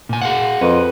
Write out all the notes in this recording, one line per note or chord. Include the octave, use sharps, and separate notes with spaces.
A#2 G#5
G#4 F5 F#5
F2 B4